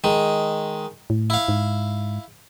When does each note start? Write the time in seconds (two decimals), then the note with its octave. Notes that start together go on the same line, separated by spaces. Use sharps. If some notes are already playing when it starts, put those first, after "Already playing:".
0.04 D#3 G#3
1.10 A2
1.30 E4 F5
1.48 G#2